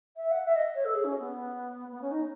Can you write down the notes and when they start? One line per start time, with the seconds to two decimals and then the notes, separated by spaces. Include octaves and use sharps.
0.16 E5
0.31 F#5
0.45 E5
0.56 D#5
0.75 C#5
0.85 A4
0.95 G#4
1.04 C#4
1.19 B3
1.92 B3
2.02 C#4
2.11 D#4